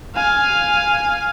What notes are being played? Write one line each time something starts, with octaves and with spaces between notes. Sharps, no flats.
F5 G#5